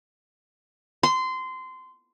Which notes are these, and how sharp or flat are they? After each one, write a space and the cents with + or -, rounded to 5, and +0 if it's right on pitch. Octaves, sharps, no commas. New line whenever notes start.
C6 -20